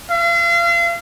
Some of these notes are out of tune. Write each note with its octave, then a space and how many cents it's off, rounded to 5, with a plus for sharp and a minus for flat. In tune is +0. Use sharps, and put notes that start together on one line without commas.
F5 -40